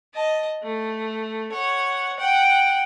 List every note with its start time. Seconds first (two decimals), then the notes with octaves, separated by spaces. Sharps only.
0.15 D#5 A5
0.63 A3
1.52 C#5 F#5
2.18 F#5 G5